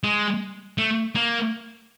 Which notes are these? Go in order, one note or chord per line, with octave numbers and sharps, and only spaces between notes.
G#3
A3
A#3